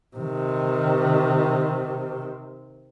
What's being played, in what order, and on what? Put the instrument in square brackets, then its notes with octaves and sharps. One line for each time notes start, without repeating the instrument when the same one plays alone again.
[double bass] C3 D#3